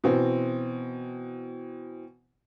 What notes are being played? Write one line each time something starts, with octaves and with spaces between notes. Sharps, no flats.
B2 E3 C4